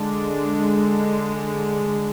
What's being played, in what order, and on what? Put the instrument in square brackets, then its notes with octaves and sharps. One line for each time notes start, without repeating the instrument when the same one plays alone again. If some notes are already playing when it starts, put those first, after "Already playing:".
Already playing: [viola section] D3 G#3 D4